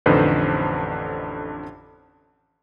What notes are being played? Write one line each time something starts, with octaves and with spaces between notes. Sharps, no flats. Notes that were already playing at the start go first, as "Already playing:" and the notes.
A1 F2 D3 D#4 B4 C5